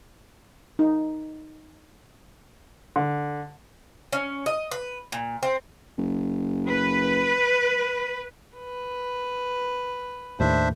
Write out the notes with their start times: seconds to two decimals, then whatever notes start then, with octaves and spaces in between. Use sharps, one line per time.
0.79 D#4
2.96 D3
4.13 C#4
4.46 D#5
4.71 B4
5.12 A#2
5.43 C4
5.98 F#1
6.68 B4
8.58 B4
10.40 D#2 A2 D4 C5 E5